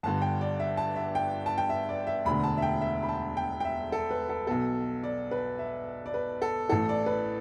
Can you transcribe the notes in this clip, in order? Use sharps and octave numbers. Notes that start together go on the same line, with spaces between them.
G1 G2 D3 A5
G5
D5
E5
A5
E5
G5
A5
G5
E5
D5
E5
E1 D2 D3 B5
A5
E5
G5
E5
B5
A5
G5
G5
E5
A4
B4
A4
B1 B2 A4
D5
B4
E5
D5
B4
A4
A1 A2 E3 A4
D5
B4